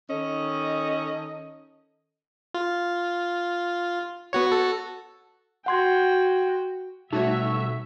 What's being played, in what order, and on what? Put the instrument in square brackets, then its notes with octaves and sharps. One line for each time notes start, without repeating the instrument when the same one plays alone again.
[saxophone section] D#3 C#4 A4 D#5
[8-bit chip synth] F4
B3 F#4 C#5
F#4 A4
[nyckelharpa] F#4 G5 [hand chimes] F#5 C6 G#6
[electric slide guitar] B2 G3 C#4 [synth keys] A3 F#4 C#5 [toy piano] D#4 [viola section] E5